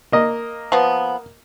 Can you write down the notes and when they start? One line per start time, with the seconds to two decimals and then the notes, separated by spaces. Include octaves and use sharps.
0.12 A#3 D#5
0.72 F3 B3